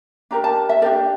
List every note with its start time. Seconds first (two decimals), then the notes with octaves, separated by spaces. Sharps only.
0.31 D4 G4 A#4 A#5
0.44 A5
0.69 E5
0.82 D4 G4 A#4 D5